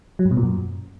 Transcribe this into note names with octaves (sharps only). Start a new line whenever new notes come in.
F#3
G2
B2
A#2
F#2